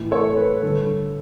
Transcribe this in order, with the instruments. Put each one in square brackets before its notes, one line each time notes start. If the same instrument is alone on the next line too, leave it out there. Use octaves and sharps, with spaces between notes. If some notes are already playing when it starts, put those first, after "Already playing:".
Already playing: [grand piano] A2 E3
A4 C#5
B4
G2 D3 A4